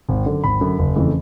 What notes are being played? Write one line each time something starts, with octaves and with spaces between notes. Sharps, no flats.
G#1
F#2 D3
G#1 B5
F#2 D3
F#1
F2 C#3 E3 A3